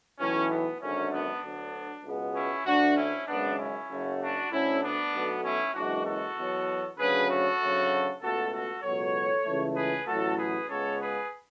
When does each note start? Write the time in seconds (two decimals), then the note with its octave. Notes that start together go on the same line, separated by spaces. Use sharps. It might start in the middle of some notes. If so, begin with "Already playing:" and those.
0.19 B1 A2 E3 C#4
0.50 B3
0.80 G#1 F#2 D3 F#3 A3 C#4
1.12 B3 D4
1.43 D2 D3 F#3 B3
2.04 C#2 B2 G#3 B3
2.35 C#4 E4
2.66 D2 D3 A3 D4 F#4
2.97 C#4 E4
3.28 G#1 F#2 C#3 G#3 B3 D4
3.59 C#4 E4
3.89 F#1 F#2 C#3 F#3 A3
4.20 D4 F#4
4.51 D2 D3 A3 C#4 E4
4.82 B3 D4
5.13 B1 B2 A3
5.44 C#4 E4
5.74 F#1 F#2 E3 G#3 D4 F#4
6.05 F#4 A4
6.36 E2 B2 F#3 B3
6.98 D2 C#3 F#3 A3 G#4 B4
7.29 F#4 A4
7.59 D2 C#3 F#3 A3
8.22 C#2 B2 A3 F#4 A4
8.52 F#4 A4
8.83 C#2 B2 F#3 A4 C#5
9.45 C#2 C#3 E3 A3
9.76 G#4 B4
10.07 A1 A2 F#3 A3 F#4 A4
10.38 G#4 B4
10.68 C#2 C#3 G#3 B3 A4 C#5
11.00 G#4 B4